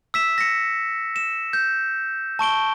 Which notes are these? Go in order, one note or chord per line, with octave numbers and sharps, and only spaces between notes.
E6 B6 E7
A#6 C#7
E7
G6
A5 C#6 D7 G7